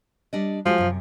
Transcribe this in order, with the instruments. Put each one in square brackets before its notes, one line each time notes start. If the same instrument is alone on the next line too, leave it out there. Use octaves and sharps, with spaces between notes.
[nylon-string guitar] G3 D4 D#5
[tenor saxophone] F3 [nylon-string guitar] G#3 F#4 G4
[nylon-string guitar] F#2 C3